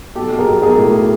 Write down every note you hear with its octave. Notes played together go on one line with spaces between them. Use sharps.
B1 G4 A4
B1
G#4 A#4
B1
B1 G#4 A#4
A2